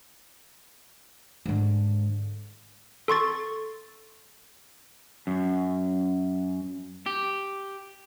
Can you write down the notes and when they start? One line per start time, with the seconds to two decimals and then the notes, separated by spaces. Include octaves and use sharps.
1.46 G#2 D3
3.08 A4 C6 C#6 A6
5.27 F#2
7.06 G4